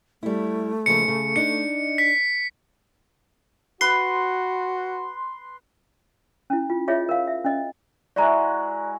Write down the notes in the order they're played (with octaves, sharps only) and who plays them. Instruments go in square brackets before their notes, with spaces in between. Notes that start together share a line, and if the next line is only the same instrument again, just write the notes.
[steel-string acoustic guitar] G3 E4 [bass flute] A3
[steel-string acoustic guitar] D#2 C#3 F3 [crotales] C#7
[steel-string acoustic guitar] C#3
[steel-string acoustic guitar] D4 D#4 [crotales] C#7
[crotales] B6
[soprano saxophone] F#4 [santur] B4 [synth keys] C6
[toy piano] C#4 E4
F4
F4 G#4 C#5 D#5 E5
A#4 F5
E5
C#4 D#5
[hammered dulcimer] G#3 E4 F#4 [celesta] D5 A#5